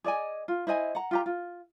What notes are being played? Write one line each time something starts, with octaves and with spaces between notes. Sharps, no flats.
G#4 D5 D#5 G#5
F4
E4 C5 D#5 G#5
F#5 A#5
F4 G4 A#5
F4